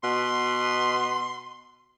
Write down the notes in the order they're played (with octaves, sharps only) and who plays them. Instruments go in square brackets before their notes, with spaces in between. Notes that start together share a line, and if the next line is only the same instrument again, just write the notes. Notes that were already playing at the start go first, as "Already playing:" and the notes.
[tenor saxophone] B2 [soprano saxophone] C6